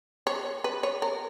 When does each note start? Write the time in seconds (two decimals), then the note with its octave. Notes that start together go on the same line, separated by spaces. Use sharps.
0.27 C#5
0.64 B4
0.83 C#5
1.02 A#4